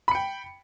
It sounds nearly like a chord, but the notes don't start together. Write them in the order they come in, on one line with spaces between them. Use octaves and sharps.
B5 C#7 G5